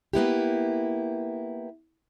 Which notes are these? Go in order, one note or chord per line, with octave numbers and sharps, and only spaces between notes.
A#3 B3 E4 G4